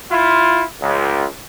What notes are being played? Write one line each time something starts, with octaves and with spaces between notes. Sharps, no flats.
E4 F4
C#2